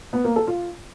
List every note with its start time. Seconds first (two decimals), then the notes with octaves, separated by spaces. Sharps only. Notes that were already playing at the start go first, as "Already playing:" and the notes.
0.13 B3
0.24 A#3
0.36 A4
0.47 F4